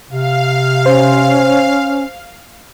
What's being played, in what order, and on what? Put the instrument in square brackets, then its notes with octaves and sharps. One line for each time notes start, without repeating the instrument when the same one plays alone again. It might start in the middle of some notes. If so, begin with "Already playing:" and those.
[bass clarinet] C3 [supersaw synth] F5
[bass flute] C#4 [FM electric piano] C5